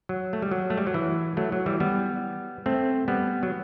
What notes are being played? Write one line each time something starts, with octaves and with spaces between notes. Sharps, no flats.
F#3
A3
G3
F#3
A3
G3
F#3
E3
F#3 A3
F#3
E3 G3
G3 B3
A3 C4
G3 B3
F#3